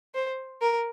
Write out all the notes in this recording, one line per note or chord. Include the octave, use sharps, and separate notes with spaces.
C5
A#4